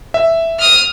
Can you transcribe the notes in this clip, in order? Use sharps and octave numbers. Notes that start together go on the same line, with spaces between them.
E5
D#6 F6